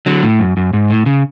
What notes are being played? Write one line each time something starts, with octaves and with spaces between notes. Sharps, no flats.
D3 F#3
A2
F#2
F#2
G#2
A2
C#3